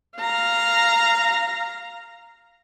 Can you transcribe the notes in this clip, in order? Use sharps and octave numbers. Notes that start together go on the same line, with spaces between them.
F5 A#5